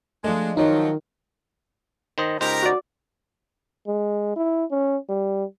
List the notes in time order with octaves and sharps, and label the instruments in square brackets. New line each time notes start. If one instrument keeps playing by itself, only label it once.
[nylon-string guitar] F3 D#5 [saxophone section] G#3 D4 [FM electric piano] A3
[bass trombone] D#3 [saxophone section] F3 F#3 [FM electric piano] D#4 [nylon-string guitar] F4 D#5
[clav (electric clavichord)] D#3 C5 D#5
[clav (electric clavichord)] C#2 D#4 C5 [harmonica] G4 A#4 A#5
[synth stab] F#4 D5
[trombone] G#3
E4
C#4
G3